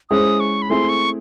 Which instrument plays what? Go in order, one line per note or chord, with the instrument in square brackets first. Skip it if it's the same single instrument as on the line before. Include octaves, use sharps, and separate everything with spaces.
[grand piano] G#3 C#4 E4 G#4 C5 [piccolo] D#6
[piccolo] C#6
B5
[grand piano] A3 C4 E4 G#4 [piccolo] C6
[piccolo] C#6